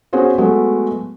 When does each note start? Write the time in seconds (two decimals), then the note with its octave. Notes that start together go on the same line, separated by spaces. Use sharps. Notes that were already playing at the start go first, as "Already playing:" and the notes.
0.13 B3 C#4 F#4 G#4 C5 C#5
0.38 F#3 G#3 A3 B3